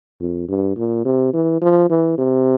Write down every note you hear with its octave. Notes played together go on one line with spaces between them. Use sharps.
F2
G2
A#2
C3
E3
F3
E3
C3